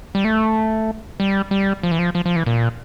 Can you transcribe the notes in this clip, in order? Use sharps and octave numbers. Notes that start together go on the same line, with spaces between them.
G3
A3
G3
G3
F3
E3
F3
F3
F3
E3
A#2